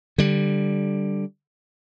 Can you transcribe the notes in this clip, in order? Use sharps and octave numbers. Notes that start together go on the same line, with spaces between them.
D3 G3